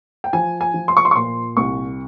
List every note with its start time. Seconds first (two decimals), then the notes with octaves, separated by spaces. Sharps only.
0.24 G5
0.33 F3 G#5
0.61 G#5
0.74 F3
0.88 C6
0.97 C#6
1.05 C6
1.11 C#6
1.16 A#2 C6
1.57 C2 C#6